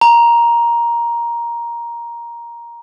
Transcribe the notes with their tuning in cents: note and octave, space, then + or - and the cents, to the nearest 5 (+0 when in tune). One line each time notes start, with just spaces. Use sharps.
A#5 +10